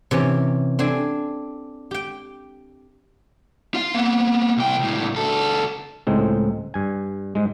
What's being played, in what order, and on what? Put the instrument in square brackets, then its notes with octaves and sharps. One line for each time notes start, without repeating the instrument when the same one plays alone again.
[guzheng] C3 E3 C#4
C4 D4 A4 G#5
G4 G5
[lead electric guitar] F4 F5
A#3 B3
C2 G5
C#2 A2
C#2 A4
[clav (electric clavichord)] C#2 A2 G#3 C4
G2 G#5
G#2 G#3